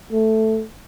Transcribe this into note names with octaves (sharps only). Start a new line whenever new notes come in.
A3